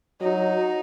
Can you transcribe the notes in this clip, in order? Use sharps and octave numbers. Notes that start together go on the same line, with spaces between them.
F#3 D#4